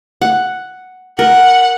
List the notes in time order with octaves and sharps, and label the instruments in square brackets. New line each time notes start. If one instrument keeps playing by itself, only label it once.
[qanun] F#5
[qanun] A#4 [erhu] F#5